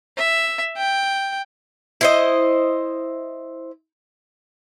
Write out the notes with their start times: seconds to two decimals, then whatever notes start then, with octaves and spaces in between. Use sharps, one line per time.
0.18 E5
0.77 G5
2.01 E4 C5 D#5